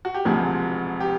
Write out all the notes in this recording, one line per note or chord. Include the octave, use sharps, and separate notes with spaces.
F#4
G4
E1 D2 C3 F3 G#3 G#4
G4